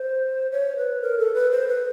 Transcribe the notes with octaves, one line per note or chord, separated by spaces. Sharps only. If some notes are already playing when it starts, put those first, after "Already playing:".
Already playing: C5
C#5
B4
A#4
A4
B4
C5
B4